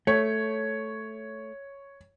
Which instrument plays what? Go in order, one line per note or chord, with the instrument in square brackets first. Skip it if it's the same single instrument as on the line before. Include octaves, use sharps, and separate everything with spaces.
[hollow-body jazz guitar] A3 [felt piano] C#5